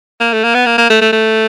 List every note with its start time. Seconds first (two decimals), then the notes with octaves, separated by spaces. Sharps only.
0.20 A#3
0.33 A3
0.44 A#3
0.55 B3
0.66 A#3
0.78 A#3
0.90 A3
1.01 A3
1.13 A3